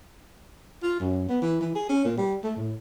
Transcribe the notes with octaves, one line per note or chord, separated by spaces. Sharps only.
F4
F#2
B3
E3
E3
G#4
C#4
A#2
G3
A3
A2